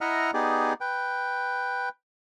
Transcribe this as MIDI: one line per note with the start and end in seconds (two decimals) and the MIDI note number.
0.01 0.31 64
0.01 0.31 75
0.01 0.31 76
0.01 0.31 78
0.01 0.31 82
0.01 0.31 89
0.34 0.73 59
0.34 0.73 63
0.34 0.73 67
0.34 0.73 68
0.34 0.73 74
0.81 1.89 71
0.81 1.89 79